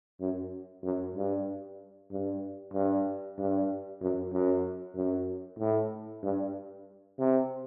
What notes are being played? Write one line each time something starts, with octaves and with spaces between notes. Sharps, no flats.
F#2
F#2
G2
G2
G2
G2
F#2
F#2
F#2
A2
G2
C3